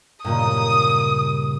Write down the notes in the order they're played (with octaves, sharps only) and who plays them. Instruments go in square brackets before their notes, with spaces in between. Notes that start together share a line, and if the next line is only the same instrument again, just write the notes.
[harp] G2 A#2 C#3 [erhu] D#6